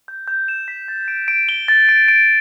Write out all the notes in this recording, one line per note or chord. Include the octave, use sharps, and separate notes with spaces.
G6
G6
E7
B6
A6
D7
D7
G7
A6
D7
D7